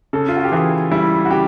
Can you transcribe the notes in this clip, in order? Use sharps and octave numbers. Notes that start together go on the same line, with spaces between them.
C#3 A4
F4
F#4
G4
E3 G#4
G3 E4
F#4
C#3 G4